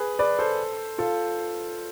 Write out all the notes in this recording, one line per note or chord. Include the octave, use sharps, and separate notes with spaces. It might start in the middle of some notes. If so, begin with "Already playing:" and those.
Already playing: G#4 B4
B4 D5
A4 C5
F4 A4